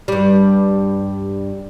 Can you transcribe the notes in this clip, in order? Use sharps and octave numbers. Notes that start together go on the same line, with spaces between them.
G2 G3